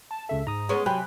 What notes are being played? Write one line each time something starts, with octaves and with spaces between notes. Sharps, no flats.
A5
C#2 C#3 A4 E5
G#2 A#5 D#6
G#3 B3 C#4
C3 F#3 G5 G#5 B5 F#6